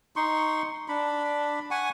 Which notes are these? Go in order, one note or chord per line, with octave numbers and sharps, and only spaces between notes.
D#4 C6 C#6
D4 B5
F#5 G#5 C#6